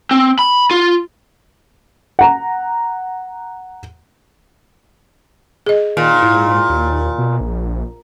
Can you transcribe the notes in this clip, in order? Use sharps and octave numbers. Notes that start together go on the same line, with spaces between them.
C4
B5
F4
F#5 A#5
G#4 D#5
A#2 D#3
G#2 E4
D#2
B2
A#1